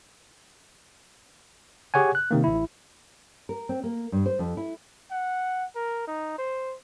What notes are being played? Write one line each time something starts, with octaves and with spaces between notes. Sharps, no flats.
G4 G#4 C#5 F#5 G#5
F#6
C3 D#3 A#3
A1 E4
A#4
C4
A#3
G2
C5
F2
E4
F#5
A#4
D#4
C5